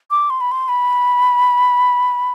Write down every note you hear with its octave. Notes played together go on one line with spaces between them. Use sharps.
D6
C6
B5
C6
B5